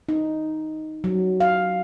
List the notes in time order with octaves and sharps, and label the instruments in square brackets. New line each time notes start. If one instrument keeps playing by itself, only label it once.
[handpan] D#4
F#3
F5